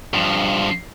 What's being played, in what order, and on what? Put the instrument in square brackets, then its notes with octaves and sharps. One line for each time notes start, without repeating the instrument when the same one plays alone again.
[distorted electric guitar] G2 F3